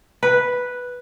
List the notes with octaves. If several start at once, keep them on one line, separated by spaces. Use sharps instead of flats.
B4